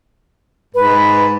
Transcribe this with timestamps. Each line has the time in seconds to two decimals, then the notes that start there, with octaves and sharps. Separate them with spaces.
0.75 G#2 B4